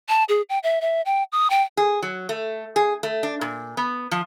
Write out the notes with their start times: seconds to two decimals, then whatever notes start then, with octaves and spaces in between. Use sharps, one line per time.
0.09 A5
0.29 G#4
0.49 G5
0.63 E5
0.81 E5
1.06 G5
1.32 D#6
1.50 G5
1.77 G#4
2.02 F#3
2.29 A3
2.76 G#4
3.03 A3
3.23 D4
3.41 A#2
3.77 B3
4.11 F3